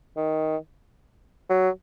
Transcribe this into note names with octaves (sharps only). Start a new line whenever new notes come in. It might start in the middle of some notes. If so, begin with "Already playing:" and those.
D#3
F#3